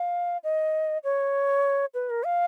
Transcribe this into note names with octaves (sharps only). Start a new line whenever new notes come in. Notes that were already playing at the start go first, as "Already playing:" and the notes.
Already playing: F5
D#5
C#5
B4
A#4
F5